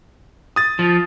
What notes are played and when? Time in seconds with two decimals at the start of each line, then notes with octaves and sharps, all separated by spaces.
0.56 D#6 A6
0.79 F3